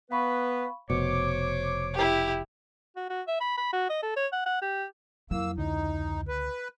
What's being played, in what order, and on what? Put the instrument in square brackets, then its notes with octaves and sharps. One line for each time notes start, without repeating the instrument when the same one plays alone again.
[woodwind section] B3 B4 [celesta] F5 B5 C#6
[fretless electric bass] F1 B2 [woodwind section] C5 C#5 D6 [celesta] C#7
[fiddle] E4 G4
[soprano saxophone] F#4
F#4
E5
B5
B5
F#4
D#5
A4
C#5
F#5
F#5
G4
[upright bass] F2 E4 [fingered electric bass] F#3 [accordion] A#3 E6
[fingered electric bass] C#2 D3 [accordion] D#4
[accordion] B4